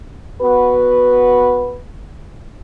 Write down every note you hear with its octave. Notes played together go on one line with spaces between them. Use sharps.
B3 F#4 B4